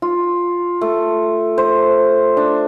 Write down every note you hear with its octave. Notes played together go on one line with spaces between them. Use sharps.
F4
A3
C5
D4